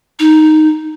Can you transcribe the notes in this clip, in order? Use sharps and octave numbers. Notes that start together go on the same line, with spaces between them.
D#4